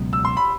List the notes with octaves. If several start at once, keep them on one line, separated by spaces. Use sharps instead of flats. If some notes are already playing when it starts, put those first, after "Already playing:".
Already playing: C#2 B2 F#3 B3
E6
C6
B5